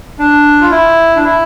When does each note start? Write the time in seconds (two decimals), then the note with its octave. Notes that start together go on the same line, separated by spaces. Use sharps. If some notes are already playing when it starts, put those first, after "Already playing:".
0.19 D4
0.61 F4
0.71 E4
1.16 D4
1.24 E4